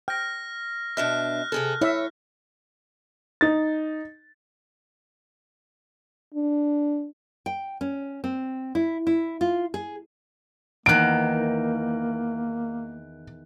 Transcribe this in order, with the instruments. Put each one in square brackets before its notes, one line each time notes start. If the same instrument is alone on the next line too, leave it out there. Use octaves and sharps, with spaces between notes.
[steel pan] G5 [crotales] F6 A#6
[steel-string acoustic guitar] B2 D4 E5 [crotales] F6 F#6
[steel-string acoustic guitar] C3 G#4 A4
[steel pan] E4 E5 [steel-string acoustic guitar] C#5
[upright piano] D#4 A6
[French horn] D4
[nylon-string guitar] G5
C#4
C4
E4
E4
F4
G#4
[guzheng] E2 D#3 [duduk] A#3 [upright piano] F#6 D7